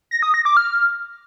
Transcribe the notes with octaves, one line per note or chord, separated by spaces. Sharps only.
A#6
D#6
A#6
D6
F6